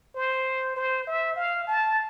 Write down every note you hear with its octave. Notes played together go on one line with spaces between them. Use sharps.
C5
C5
E5
F5
A5